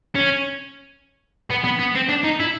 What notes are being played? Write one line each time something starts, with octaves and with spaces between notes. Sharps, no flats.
C#4
B3
B3
B3
C4
D4
D#4
E4